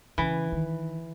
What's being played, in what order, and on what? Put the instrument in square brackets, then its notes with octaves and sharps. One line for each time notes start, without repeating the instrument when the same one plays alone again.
[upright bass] C#3 [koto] E3
[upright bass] D#3